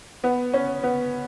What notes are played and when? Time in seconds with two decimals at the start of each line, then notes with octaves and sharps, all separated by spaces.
0.24 B3
0.53 C#4
0.83 B3